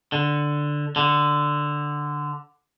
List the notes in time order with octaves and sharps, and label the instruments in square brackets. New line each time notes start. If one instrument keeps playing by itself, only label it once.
[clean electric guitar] D3
D3